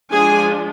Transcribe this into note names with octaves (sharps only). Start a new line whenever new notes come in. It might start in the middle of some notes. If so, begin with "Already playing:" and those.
F3 G#3 D4 G#4 G#5